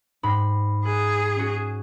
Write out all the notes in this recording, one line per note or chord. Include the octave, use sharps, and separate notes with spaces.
G#2 B5
G#4 F#6
C#4 F#4